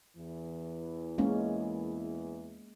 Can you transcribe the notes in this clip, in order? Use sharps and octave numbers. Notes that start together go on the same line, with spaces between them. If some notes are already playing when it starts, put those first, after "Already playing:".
E2 E3
G#3 A#3 C#4